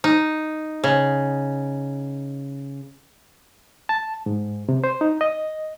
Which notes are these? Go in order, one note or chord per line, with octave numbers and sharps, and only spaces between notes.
D#4
C#3
A5
G#2
C3
C5
D#4
D#5